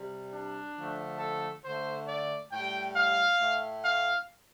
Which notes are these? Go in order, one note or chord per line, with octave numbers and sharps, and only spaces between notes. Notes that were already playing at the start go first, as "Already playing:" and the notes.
Already playing: C3 G3
D4
D3 F3 A3
A4
D3 A3 C5
D5
A2 G3 G5
F5
A2 A3
F5